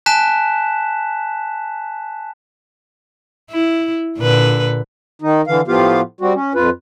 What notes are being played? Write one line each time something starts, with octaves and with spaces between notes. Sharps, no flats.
G#5 A5 F#6 B6 E7
E4
A#2 D3 B4
D#3 D#4
D3 E3 F5
A2 F3 B3 F4 G4 F5
G3 C4 F#4
C#4
F2 F4 B4